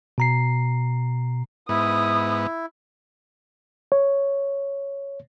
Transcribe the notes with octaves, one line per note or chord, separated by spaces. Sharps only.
B2 A#5 C7
G#2 B3 E4 D#6
C#5